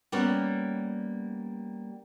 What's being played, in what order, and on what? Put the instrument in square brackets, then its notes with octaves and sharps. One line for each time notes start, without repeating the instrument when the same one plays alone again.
[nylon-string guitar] G3 A#3 B3 C#4